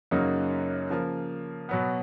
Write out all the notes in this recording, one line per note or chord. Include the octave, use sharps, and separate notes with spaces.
F#2 C#3 F#3 A#3 D#4
C#3 F3 A#3
B2 F#3 B3